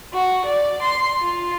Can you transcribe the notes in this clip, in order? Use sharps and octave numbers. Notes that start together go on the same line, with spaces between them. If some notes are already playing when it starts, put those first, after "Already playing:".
F#4
D5
C6
F4